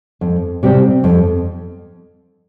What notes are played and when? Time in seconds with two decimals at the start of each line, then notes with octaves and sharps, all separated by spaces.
0.21 F2
0.63 C3 G3 C4
1.04 F2